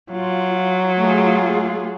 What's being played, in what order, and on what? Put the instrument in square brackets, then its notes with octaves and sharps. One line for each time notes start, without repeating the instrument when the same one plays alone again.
[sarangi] F#3 [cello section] F4
[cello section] A3 F4 G#4